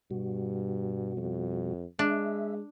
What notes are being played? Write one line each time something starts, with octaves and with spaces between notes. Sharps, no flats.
G2 B2 G3 F#4
F2
G#3 D4 E5